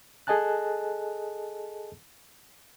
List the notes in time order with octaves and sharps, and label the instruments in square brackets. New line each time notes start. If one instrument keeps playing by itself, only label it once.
[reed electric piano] G#4 A4 D#5 G#5 A5 F#6